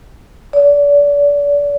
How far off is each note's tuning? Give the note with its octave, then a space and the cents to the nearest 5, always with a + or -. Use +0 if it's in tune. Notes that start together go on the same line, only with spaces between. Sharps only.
D5 -35